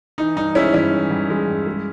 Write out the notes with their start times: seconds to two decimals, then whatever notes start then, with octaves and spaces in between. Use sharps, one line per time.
0.18 E3 D#4
0.36 G2 D#4
0.55 G#3 C#4 E4
0.74 G2 C#4 E4
0.92 E3
1.11 G2
1.30 G#3
1.48 G2
1.67 G#3